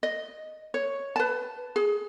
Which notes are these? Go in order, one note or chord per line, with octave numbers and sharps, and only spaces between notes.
D#5
C#5
B4 A5
G#4